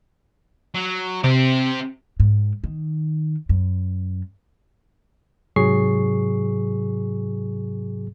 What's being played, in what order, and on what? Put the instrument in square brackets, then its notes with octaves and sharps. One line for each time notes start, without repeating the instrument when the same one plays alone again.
[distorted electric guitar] F#3
[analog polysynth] C3 [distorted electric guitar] C4 G4
[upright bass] G#2
D#3
F#2
[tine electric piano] G#2 C3 F#3 G#4 C#6 C7